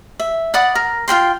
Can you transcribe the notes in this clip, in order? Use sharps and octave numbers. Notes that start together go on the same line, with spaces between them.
E5
D5 F#5 B5 D#6
A#4
F4 A#4 G5 C6